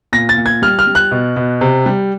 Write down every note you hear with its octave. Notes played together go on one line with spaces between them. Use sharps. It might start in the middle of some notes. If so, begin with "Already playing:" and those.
A#2 A#6
A6
A#2
G#6
G3 F6
F6
G3
F#6
B2
B2
C3
G3